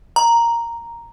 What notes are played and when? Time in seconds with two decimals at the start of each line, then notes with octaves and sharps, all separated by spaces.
0.16 A#5